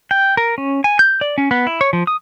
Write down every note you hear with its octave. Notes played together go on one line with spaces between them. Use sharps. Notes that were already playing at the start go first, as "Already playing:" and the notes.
G5
A#4
C#4
G#5
G6
D5
C#4
B3
E4
C#5
F3
D#6